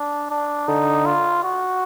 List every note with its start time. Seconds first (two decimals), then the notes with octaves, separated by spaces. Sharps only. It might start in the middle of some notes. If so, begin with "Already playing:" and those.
Already playing: D4
0.30 D4
0.68 D3 D#4
1.05 F4
1.43 F#4